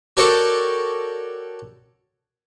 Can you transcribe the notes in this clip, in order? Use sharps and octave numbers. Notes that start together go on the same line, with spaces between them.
F#4 A4 A#4 C#5 D5 G5